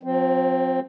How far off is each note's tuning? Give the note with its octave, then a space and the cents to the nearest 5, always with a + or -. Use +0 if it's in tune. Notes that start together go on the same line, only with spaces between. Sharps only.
F3 +40 C4 +0